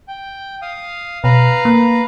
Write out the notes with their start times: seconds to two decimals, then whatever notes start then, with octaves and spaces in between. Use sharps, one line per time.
0.08 G5
0.62 F5 D#6
1.24 B2 B4 F5 A#5
1.65 A#3